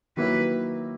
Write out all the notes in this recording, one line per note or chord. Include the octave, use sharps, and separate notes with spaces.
D#3 F#3 A#3 E4 B4